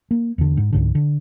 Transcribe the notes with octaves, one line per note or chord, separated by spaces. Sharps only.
A#3
E2 D3
G#2
C#2 G#2 D3
D3